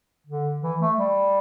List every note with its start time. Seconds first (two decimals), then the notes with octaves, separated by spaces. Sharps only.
0.27 D3
0.62 E3
0.81 A3
0.99 G3